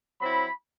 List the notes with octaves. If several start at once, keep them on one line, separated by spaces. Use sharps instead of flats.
F#3 C4 E4 B5